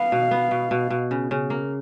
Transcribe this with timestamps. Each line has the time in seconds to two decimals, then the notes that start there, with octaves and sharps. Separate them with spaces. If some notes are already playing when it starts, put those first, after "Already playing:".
Already playing: B3 F5
0.12 B2
0.31 B3
0.51 B2
0.71 B2
0.90 B2
1.11 C#3
1.31 C#3
1.50 A#3